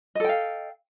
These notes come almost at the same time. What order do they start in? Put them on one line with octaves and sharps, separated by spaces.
D#5 A4 G5 F5